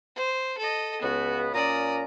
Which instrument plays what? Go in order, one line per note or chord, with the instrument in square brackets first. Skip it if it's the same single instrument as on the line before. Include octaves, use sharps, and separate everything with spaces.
[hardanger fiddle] C5
A4 D#5
[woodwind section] C#2 B3 [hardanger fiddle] F#4
[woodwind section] A#2 C#4 A#5 [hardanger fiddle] D5 D#6